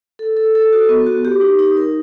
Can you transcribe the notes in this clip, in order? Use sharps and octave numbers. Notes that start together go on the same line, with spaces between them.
A4
A4
A4
F#4
B3
F#4
G4
D#4
D#4
A#4